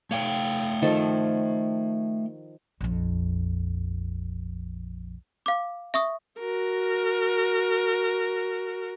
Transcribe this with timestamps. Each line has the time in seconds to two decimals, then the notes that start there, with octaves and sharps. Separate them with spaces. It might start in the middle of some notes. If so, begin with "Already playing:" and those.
0.11 A3 C#5 F5 G5
0.82 D#3 F3 A4
2.81 A#1 F2
5.46 F5 D6
5.94 E5 C#6 D#6
6.40 F#4 A#4